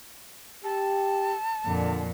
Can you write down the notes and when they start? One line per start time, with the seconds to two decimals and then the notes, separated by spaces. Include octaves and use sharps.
0.64 G4 A5
1.66 F2 A#2 D3